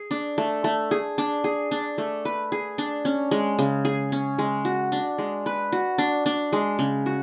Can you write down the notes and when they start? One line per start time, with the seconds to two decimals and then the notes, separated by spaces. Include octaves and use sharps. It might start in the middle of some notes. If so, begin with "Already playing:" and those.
Already playing: G#4
0.11 D4
0.38 A3
0.64 A3
0.91 G#4
1.18 D4
1.44 G#4
1.71 D4
1.98 A3
2.25 B4
2.52 G#4
2.78 D4
3.05 C#4
3.31 G#3
3.59 C#3
3.85 G#4
4.12 C#4
4.39 G#3
4.65 F#4
4.92 D4
5.18 G#3
5.46 B4
5.72 F#4
5.98 D4
6.26 D4
6.53 G#3
6.79 C#3
7.06 F#4